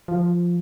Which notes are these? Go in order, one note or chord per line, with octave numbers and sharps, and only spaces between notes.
F3